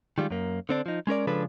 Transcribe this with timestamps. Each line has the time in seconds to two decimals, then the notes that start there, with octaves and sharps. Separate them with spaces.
0.18 D#3 G3 G#3 F4
0.31 F#2 A#3
0.69 D3 C4 D4
0.86 F3 D#4
1.07 G#3 C#4 A#4 D5
1.27 C#3 F3 G#3 D4 A4 B4